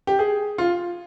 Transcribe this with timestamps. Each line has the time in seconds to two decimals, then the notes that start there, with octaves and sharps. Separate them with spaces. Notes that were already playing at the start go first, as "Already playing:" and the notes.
0.07 G4
0.19 G#4
0.58 F4